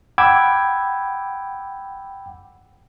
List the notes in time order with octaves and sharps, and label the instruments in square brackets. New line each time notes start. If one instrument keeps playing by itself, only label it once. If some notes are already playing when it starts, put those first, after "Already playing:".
[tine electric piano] F#5 G5 B5 D6 E6 G#6